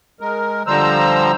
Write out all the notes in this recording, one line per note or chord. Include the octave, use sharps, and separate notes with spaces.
G#3 A#4
D3 F3 G3 C5 A#5 E6